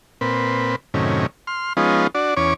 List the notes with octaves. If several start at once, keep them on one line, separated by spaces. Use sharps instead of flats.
A#2 C4 B4
F#2 A2 C3 D#3 C#4
C6 F6
F3 G#3 B3 C#4 D#4 F4
D4 F#4 D5
E2 C#4 C#5 D6